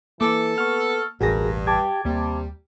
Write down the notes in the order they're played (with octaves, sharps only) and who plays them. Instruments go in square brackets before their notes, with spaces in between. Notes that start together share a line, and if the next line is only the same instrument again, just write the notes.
[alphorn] E3 [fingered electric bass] A#3 [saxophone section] A4 [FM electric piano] D6
[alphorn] B3 [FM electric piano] C#6 F6
[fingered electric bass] E1 A1 [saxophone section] G2 [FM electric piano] F#4 G#4 A#6 [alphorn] A#4
[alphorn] G4 [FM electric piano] A5 D6 G#6
[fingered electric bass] D#2 A#3 [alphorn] C3 [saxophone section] G3